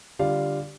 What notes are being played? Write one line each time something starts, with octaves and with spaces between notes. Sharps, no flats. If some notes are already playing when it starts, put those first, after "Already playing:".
D3 G3 F4 D5 F5